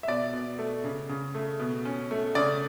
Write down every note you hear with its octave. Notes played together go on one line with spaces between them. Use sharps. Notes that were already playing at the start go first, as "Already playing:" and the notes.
E5
B2 D5
B2
A3
C#3
C#3
A3
B2
C#4
A3
C#3 D5